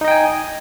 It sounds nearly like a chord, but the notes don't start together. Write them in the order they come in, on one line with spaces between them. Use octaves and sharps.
D#4 D#5 G5 G#5